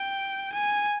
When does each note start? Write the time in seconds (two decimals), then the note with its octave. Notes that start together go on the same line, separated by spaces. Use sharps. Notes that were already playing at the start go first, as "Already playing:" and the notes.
Already playing: G5
0.52 G#5